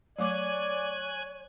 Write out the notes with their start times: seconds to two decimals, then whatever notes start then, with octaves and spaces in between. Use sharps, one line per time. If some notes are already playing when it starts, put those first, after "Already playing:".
0.18 F#3 A3 C#5 D5 G#5 D6 F#6